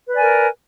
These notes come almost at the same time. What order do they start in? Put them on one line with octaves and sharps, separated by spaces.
B4 D5 G#5 A#4